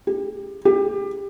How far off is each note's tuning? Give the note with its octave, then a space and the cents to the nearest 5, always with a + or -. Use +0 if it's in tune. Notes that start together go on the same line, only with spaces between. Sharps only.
G4 +25
G4 +25